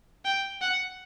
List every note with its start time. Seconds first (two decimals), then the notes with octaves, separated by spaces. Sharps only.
0.25 G5
0.61 F#5